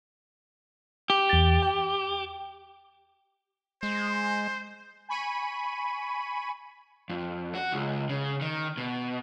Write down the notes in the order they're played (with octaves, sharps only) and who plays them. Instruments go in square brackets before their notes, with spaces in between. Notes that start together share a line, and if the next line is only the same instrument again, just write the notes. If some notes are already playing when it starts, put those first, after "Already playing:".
[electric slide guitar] G4
[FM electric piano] E2 A6
G5
[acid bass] G#3 [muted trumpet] C5
[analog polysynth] G#5 B5 C#6 D#7
[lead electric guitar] F2
F#4
C#2
C#3
D#3
B2